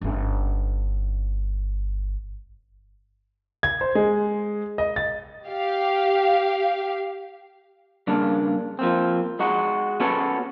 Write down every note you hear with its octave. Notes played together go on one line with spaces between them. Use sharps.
G1 C#4
G#6
C5
G#3
D#5
A6
G4 F5
G2 C#3 A#3 D4
F3 A#3 C4
G#3 D#4 F#4
B3 C#4 F#4 A4 B4 C#5